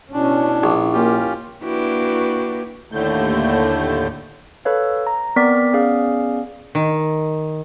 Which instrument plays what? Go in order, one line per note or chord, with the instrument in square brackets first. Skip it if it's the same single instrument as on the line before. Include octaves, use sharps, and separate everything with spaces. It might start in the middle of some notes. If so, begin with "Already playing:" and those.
[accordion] B2 D4 [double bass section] C#4 [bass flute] E4
[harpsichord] A#1
[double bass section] A#3 [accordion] C#4 F4 G4
[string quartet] A#3 D4 E4 F#4 G4 B4
[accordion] D#2 A2 D3 A3 G6
[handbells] A4 B4 C#5 F5
A#5
B3 C4 A#4 D5 D6 B6
B3 C#4 G#4 D5 F5
[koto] D#3